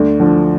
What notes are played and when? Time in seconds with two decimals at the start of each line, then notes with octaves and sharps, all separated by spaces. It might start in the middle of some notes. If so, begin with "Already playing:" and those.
Already playing: D2 D4
0.20 D3 F3